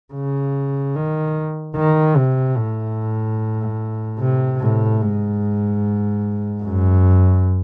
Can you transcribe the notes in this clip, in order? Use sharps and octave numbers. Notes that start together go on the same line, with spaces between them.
C#3
D#3
D#3
C3
A2
C3
A2
G#2
F#2